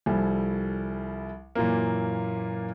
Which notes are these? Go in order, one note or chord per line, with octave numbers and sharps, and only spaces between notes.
C2 F3 G3 A4 G#5
F#2 A#2 E3 F#3 A#3